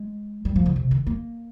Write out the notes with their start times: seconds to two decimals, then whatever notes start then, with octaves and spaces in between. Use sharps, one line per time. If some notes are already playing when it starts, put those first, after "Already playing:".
Already playing: G#3
0.45 G3
0.56 F3
0.66 D3
0.76 C3
0.91 D#3
1.07 A#3